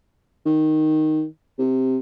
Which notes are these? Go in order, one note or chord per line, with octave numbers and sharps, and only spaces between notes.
D#3
C3